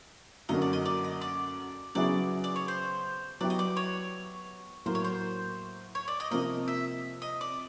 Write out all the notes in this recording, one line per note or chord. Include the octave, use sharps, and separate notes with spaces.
F#2 D3 F#3 A#3 D#4 D#5
D5
D#5
D5
D#5
D5
C#3 F#3 B3 E4 G#4 D5
D5
C#5
C5
F#3 B3 E4 G4 D5
D#5
D5
C#5
A2 F#3 A#3 C5
C#5
C5
C#5
D5
D#5
C3 F3 A#3 D#5
E5
D#5
D5